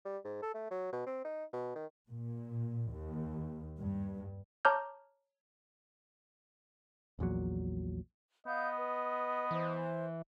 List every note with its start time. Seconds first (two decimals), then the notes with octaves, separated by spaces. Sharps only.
0.05 G3
0.25 G#2
0.42 A4
0.54 A3
0.71 F#3
0.92 B2
1.06 C4
1.25 D#4
1.53 B2
1.75 D#3
2.10 A#2
2.91 D#2
3.79 G2
4.65 C#5 A5 A#5 D6 F6 G6
7.19 A#1 E2 A#2 F#3
8.46 B3 D#5 F5 G6
8.77 B4
9.51 E3 C5